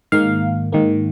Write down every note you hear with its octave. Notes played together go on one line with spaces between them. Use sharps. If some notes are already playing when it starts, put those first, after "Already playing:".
G#2 D#3 A#3 F5
G#2 D#3 A#3